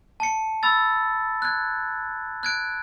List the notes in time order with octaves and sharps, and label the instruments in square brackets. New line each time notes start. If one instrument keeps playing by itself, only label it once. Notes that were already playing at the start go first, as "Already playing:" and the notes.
[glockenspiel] A5 C#7
B5 E6 A6
F#6 G#6
F#6 G#6 D7